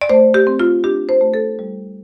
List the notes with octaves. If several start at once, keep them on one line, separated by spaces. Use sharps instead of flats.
D5
A3 C5
G4
C4
F4
D4 G4
C5
A3
A4
G3